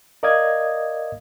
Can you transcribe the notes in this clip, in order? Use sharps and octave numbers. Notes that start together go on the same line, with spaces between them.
A#4 D5 D#5 F5 D#6 G#6